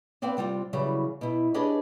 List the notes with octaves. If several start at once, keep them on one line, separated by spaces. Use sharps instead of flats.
B3 C4 B4 D5 F5 G5
C3 G3 C4 F4
C#3 E3 F#3 G3
B2 E4
D4 G4 G#4 B4 C#5 D#5